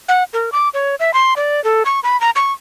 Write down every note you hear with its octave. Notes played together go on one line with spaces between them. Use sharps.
F#5
A#4
D6
C#5
E5
C6
D5
A4
C#6
B5
A#5
C#6